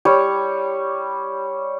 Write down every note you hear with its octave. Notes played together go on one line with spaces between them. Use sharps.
G3 C#5